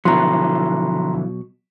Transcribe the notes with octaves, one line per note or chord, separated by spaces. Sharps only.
B2 D3 F3 F#3 E4 A#5 C6